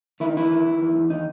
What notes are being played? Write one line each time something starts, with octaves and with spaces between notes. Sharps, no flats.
D#3 E4
D#4
E2 E4
D#3
D#3
E2
E2
D#3 D#4